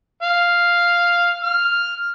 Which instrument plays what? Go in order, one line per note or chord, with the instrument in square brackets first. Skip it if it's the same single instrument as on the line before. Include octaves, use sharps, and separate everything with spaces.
[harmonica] F5
F6